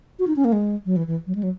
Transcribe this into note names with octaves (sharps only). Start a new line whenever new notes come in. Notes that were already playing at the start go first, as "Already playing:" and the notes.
F#4
D#4
C#4
A#3
G#3
F#3
E3
E3
F#3
G#3
F#3